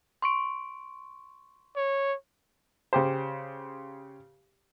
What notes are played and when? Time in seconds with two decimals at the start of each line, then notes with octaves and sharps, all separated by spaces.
0.22 C6 C#6 D7
1.76 C#5
2.93 C#3 G4 C5